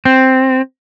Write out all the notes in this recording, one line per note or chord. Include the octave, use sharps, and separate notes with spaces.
C4